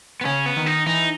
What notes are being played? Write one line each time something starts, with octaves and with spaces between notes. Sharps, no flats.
B3
C#3 C#4
B3
D#3
D#4
E3 D#4